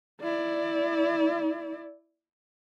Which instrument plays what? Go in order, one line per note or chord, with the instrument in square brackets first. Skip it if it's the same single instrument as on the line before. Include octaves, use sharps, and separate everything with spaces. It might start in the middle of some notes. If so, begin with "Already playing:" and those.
[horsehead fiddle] E4 D5